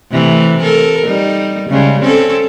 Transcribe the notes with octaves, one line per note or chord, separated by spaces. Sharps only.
C3 E3 A3
A4 A#4
G3 D#4
C#3 G3 G#3
C4 C#4 A4